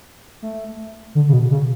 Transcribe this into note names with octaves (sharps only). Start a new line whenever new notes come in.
A3
D3
C#3
B2
C#3